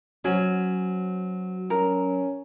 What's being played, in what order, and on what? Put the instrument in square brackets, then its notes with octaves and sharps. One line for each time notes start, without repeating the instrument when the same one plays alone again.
[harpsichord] F#3 [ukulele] C#4 [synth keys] F#4 C5
[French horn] C#4 [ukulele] A#4